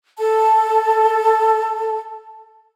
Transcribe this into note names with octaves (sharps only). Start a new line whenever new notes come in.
A4 A5